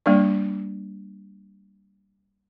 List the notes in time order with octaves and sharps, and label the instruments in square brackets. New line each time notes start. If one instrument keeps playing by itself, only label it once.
[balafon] G3 A#3 D4 D5